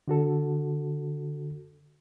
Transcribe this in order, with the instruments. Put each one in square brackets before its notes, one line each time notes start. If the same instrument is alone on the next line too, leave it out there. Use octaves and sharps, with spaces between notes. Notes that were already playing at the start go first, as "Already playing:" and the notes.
[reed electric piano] D3 F#4 A4